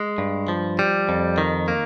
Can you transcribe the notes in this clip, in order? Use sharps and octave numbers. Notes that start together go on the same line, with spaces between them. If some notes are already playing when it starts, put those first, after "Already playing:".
Already playing: G#3
G2
F3
G3
F2
D#3
A#3